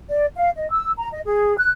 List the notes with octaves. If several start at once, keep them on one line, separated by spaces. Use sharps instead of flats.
D5
F5
D#5
E6
A#5
D#5
G#4
F#6